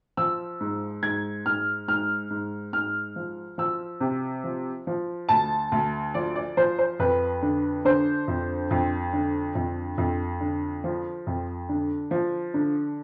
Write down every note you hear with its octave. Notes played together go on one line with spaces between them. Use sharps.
F3 E6
G#2
G#2 G#6
G#2 F6
G#2 F6
G#2
G#2 F6
F3
F3 E6
C3
F3
F3
D2 A5
D2
F3 D5
D5
F3 C5
C5
F2 B4
D3
D3 C5
F2
F2
D3
F2
F2
D3
F3
F2
D3
F3
D3